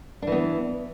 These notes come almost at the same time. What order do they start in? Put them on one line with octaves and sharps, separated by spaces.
D4 E3 B3